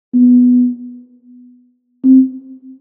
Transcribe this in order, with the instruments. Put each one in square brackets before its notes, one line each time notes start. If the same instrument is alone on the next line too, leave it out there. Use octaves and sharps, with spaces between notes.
[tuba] B3
C4